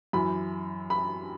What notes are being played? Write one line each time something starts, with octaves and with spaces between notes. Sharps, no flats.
F#2 E3 B5
B5